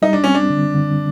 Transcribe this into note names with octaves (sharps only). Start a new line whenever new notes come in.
G3 D#4
D4
C4 C#4
D4
D3
D3